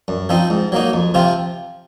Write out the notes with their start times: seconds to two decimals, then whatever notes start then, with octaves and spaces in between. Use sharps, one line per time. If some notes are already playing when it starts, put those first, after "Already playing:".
0.08 F#2
0.29 F3 C4 D#4
0.50 G#2
0.72 F#3 A#3 D#4
0.93 F2
1.14 C3 F3 C4 F4